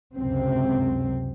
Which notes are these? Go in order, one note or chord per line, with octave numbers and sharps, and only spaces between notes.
C#2 F#2 C3 C4